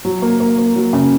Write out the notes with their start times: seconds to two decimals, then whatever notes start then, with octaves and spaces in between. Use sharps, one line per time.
0.05 F#3
0.22 A#3
0.40 A#3
0.58 A#3
0.76 F#3
0.93 C#3